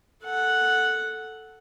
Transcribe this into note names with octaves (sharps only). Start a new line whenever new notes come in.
A4 F#5